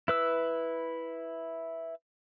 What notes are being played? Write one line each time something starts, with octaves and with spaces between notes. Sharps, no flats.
E4 B4 E6